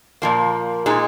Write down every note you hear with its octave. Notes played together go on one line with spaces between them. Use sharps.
A#2 F3 A#3
A#2 G#3 D#4